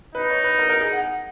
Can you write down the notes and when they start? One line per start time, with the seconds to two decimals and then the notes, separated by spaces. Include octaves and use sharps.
0.15 D#4 B4
0.30 C#5
0.44 B4
0.59 A#4
0.69 A#4
0.81 G#4
0.92 F#5